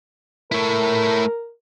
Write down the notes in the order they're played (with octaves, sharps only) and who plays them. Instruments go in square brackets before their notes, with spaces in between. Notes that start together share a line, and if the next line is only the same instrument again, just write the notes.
[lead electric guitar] A3 E4 [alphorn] A#4